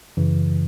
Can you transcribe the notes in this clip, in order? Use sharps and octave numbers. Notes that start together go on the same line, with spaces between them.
F#2 C#3 E3